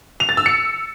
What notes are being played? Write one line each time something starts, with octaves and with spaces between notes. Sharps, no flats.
F7
A6
E6
C#7